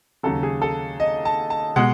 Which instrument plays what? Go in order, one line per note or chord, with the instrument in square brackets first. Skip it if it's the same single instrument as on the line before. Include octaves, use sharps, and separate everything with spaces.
[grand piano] D#2 C#3 F#3 A4
G#4
A4
D#5
A5
A5
B2 G#3 F#5